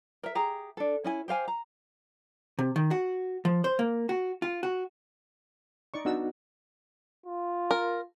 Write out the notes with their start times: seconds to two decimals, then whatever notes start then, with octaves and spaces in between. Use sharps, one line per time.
0.23 A#4 E5
0.35 G4 G#4 A#5
0.77 D4 A4
1.04 C#4 E4 G#5
1.28 G4 C5 F5 G#5
1.48 A#5
2.59 C3
2.76 D#3
2.91 F#4
3.45 F3
3.64 C5
3.79 A#3
4.09 F#4
4.42 F4
4.63 F#4
5.94 D#4 D5 C#6
6.05 B3 D4 D#4 F#4 E6
7.26 F4
7.71 A#4